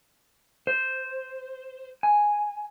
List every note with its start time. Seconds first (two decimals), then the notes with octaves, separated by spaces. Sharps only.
0.67 C5
2.03 G#5